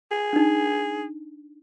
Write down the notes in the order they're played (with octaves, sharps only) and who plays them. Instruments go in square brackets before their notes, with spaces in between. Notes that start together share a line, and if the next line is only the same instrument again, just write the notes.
[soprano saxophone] G#4
[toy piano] D4 D#4